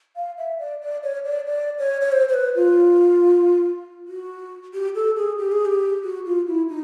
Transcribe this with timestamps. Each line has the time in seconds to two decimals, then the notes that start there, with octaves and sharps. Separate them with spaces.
0.16 F5
0.38 E5
0.59 D5
0.81 D5
1.03 C#5
1.25 D5
1.47 D5
1.79 C#5
2.01 C#5
2.12 C5
2.28 C5
2.34 B4
2.56 F4
4.08 F#4
4.74 G4
4.95 A4
5.17 G#4
5.38 G4
5.52 G#4
5.65 G4
6.04 F#4
6.26 F4
6.47 E4
6.69 D#4